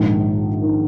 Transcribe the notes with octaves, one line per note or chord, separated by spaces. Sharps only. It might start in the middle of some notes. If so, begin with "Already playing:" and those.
Already playing: A#1 G#2 D#3
D#3